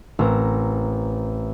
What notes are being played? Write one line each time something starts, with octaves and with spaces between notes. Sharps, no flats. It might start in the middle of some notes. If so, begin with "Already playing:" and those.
A1 C4 A#4 A#5